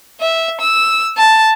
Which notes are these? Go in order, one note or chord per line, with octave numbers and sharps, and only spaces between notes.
E5
E6
A5